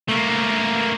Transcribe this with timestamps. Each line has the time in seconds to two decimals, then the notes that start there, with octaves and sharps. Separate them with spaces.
0.09 A3 A#3